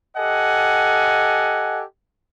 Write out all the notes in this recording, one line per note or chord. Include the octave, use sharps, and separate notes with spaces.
G4 A4 D#5 F#5 G#5